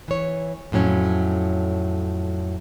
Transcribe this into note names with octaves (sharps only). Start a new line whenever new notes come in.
E3 C#5
F2 A2 F#3 C#4